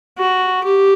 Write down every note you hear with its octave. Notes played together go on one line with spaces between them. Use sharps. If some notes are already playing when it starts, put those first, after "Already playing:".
F#4
G4